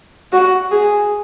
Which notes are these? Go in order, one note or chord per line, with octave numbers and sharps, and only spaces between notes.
F#4
G#4